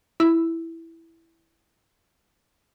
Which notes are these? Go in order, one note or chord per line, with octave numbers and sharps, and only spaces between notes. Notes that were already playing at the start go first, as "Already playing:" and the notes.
E4 E6